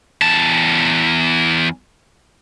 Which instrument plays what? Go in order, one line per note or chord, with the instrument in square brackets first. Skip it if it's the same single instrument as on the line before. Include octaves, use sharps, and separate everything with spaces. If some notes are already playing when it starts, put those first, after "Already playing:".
[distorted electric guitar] E2 A5